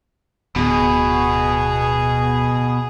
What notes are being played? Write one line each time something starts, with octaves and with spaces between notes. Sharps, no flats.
D1 B2 G#4